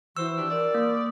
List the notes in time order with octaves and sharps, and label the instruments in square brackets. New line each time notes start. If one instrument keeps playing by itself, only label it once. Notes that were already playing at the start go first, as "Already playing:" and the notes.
[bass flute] E3 [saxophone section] F#4 C5 [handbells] E6
[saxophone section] D4 G4
[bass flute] A#4 [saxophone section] D5
[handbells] A#3